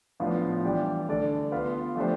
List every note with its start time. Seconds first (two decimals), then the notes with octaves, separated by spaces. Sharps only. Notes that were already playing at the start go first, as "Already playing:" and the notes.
0.20 A2 F3 B3 D4 F4
0.64 E3 G3 D4 G4 D5
1.08 D3 A3 D4 A4 D5
1.52 B3 F4 B4 F5
1.96 F3 A3 D4 G4 C5